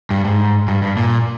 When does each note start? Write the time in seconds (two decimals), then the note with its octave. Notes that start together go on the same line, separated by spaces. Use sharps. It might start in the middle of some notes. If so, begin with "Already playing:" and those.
0.10 G2
0.25 G#2
0.68 G2
0.82 G2
0.97 A#2